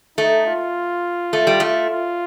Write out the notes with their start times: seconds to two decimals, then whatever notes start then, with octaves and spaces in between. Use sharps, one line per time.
0.18 A3 D#4
0.47 F4
1.33 A3
1.47 G3
1.60 A3
1.90 F4